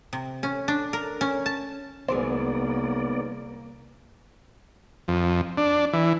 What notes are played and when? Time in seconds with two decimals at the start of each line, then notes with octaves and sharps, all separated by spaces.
0.13 C3
0.43 C#4
0.68 D4
0.93 A#4
1.21 C#4
1.46 A5
2.08 C2 D#3 F#3 G#3 A#3 B3 C5 D5
5.08 F2
5.58 D4
5.93 E3